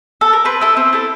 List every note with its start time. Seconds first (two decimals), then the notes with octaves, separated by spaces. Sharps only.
0.21 A4
0.33 A#4
0.45 C4 B4
0.61 E4 A4
0.77 C4
0.93 E4 A4